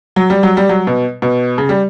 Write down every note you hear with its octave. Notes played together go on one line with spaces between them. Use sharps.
F#3
G3
F#3
G3
F#3
B2
B2
C#3
G3